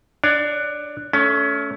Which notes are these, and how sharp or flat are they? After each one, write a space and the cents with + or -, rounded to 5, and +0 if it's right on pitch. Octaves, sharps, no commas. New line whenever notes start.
D4 +15 C#5 +35
A3 -5 C#4 +25